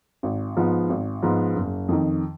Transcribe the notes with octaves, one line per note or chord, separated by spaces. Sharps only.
G#1
G#2 F3 B3
G#1
G#2 F3 B3
F#1
F2 D#3